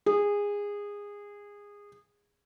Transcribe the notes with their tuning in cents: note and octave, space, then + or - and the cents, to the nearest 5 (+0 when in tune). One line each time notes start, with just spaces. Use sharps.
G#4 -20